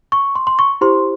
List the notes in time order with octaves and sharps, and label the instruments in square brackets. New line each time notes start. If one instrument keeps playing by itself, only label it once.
[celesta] C#6
C6
C6
C#6
E4 G4 C5 C6